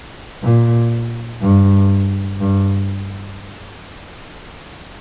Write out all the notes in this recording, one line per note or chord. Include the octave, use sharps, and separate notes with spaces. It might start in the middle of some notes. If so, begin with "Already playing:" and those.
A#2
G2
G2